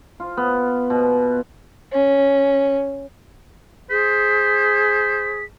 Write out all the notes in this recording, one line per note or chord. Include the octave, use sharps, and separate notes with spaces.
F4
B3
B2
C#4
G#4 C5 B6